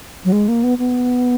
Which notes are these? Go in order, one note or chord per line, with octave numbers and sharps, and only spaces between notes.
F#3
G#3
A#3
B3
B3